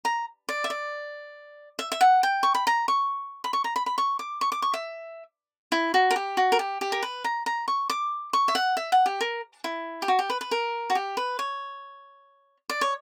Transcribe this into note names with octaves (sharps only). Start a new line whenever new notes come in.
A#5
D5
E5
D5
E5
E5
F#5
G5
C#6
B5
A#5
C#6
B5
C#6
A#5
B5
B5
C#6
D6
C#6
D6
C#6
E5
E4
F#4
A#4
G4
F#4
A#4
G4
G4
A#4
B4
A#5
A#5
C#6
D6
C#6
E5
F#5
E5
F#5
G4
A#4
E4
G4
F#4
G4
B4
B4
A#4
F#4
G4
B4
C#5
D5
C#5